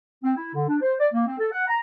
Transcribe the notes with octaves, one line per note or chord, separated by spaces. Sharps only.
C4
E4
D3
D4
C5
D5
A#3
C4
A4
F#5
A#5